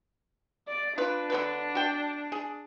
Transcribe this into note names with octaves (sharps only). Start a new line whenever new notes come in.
D5
D4 F4 B4
D3 F#3 B4
F#4 G5
G#4